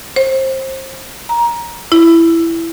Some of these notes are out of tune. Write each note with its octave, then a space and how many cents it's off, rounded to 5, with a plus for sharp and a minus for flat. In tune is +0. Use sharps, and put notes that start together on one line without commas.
C5 +25
A#5 +15
E4 +10